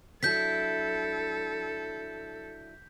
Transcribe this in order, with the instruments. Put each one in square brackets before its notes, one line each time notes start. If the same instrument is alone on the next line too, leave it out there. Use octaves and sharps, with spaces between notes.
[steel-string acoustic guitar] F#3 D4 E4 [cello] A4 [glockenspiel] G6 B6